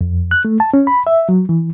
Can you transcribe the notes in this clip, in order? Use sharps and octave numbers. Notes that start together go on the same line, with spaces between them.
F2
F#6
A3
A5
C#4
B5
E5
F#3
E3